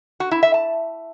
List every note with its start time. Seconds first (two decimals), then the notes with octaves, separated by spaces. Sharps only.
0.20 F#4
0.31 E4
0.43 E5
0.54 A5